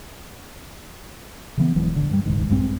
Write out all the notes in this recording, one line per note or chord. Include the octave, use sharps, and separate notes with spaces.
C#3 E3 B3
D#1 E3 F#3 G#3
A1 D3
G2 G3
D#1 C#2 G#2 D#3
A#1 G2 G#3 C4